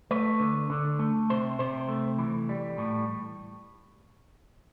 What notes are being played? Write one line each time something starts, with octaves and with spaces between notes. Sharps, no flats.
A3 B4
D3
D3
A3
C3 C5
C3 C5
A3
E3
G3
A2